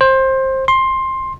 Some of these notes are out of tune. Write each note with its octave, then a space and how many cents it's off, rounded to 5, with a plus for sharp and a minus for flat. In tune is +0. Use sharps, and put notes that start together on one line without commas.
C5 +20
C6 +15